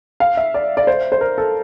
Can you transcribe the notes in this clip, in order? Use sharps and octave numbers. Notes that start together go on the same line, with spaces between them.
F5
E5
D5
D5
C5
C5
A#4
A4